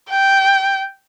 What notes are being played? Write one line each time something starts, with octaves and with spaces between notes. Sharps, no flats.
G5